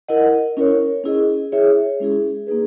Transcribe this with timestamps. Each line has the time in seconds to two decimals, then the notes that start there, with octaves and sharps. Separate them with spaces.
0.09 E4 A#4 D#5 F#5
0.57 C#4 E4 A#4 C#5
1.04 C#4 E4 G#4 D#5
1.52 E4 G#4 C#5 E5
2.00 G#3 C#4 E4 G#4
2.47 A#3 D#4 G#4 B4